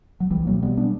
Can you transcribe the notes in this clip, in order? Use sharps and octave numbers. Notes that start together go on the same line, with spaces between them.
F#3
C#2 E3 G3
B2 F#3 A#3
B2 G3 B3
B3 D4